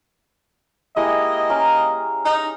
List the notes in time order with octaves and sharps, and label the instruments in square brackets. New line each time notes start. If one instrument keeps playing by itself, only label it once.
[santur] G#3 E4 G4 [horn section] A#3 D#5
[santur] C#4 F5 A#5
[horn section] D#4